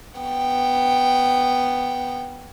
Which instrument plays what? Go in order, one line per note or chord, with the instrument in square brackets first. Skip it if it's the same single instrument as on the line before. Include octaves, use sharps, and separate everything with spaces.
[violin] B3 G5